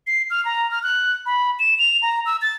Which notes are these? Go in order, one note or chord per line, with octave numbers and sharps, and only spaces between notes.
C7
F6
A#5
F6
F#6
B5
E7
F7
A#5
E6
A6